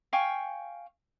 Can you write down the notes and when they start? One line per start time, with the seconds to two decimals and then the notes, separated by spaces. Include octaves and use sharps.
0.13 F5 G5 G#5 C#6